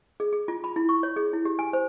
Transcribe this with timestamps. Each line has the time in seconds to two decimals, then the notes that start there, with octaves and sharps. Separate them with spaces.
0.20 G#4
0.33 G#4
0.48 F4
0.64 B5
0.76 E4
0.89 C#6
1.03 C#5
1.16 G#4
1.33 E4
1.45 G4
1.59 G#5
1.73 C5